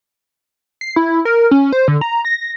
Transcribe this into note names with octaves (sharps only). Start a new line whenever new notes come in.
C7
E4
A#4
C#4
C5
D3
A#5
A#6